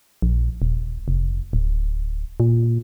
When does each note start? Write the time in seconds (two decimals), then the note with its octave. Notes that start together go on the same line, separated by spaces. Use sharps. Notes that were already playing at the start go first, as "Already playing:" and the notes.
0.22 A#1
0.62 D#1
1.08 F1
1.53 D1
2.40 A#2